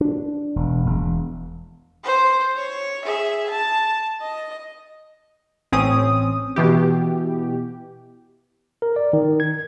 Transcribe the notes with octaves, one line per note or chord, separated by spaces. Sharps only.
D4
E1
E1
C5
C#5
G#4 E5
A5
D#5
A1 C4 C#4 D#6
B2 E3 G4
A#4
D5
D#3
G#6